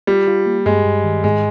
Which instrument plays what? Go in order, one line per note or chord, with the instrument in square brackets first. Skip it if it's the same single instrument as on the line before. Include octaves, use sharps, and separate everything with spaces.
[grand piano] G3 [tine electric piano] F4
[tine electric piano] F4
A#3
[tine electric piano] G2 [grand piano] G#3
[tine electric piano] G2
D#3
[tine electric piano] G#2 [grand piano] G#3